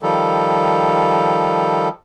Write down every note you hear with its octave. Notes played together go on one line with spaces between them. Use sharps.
D#3 F3 G3 A4